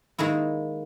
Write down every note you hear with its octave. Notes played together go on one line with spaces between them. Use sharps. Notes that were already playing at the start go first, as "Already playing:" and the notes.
D#3 G#3 A#3 E4